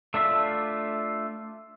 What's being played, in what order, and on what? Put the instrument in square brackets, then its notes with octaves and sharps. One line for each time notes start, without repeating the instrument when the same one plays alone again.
[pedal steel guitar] A3 D4 F4 E5